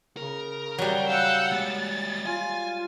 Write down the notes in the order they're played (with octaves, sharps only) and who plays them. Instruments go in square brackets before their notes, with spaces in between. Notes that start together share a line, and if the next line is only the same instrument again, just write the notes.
[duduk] C#3 [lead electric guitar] A#4
[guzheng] F#3 G3
[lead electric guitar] F5 [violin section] F#5 E6 G6
[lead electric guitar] G#3 G4 [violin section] A6
[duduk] F4 [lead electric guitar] G#5